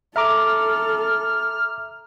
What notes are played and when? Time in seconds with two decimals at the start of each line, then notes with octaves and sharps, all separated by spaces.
0.16 A4 E5 A#5 D6 F6